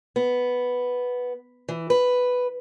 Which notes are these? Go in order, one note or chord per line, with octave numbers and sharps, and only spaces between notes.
B3
E3
B4